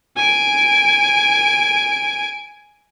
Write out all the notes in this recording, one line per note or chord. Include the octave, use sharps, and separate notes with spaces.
G#5 D7